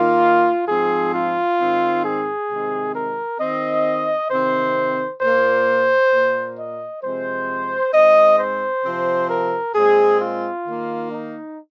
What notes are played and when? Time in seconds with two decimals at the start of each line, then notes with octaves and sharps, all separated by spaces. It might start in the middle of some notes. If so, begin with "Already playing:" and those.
Already playing: D#3 A#3 F4
0.68 G#2 F3 C4 G#4
1.14 F4
1.59 G#2 D#3 C4
2.05 G#4
2.50 C3 D#3 G#3 C4
2.95 A#4
3.40 D#3 C4 D#5
4.31 C3 D#3 C4 C5
5.21 A#2 A#3 C5
6.12 A#2 A#3
6.58 D#5
7.03 C3 F3 G#3 C4 C5
7.93 G#2 G#3 C4 D#5
8.39 C5
8.84 C3 F3 C4
9.30 A#4
9.75 A#2 G#3 C4 G#4
10.20 F4
10.66 D#3 A#3
11.11 D#4